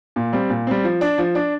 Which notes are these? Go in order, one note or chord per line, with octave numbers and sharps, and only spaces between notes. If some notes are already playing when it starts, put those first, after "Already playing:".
A#2
G3 C4
A#2
G3 C4
F3
D4
F3
D4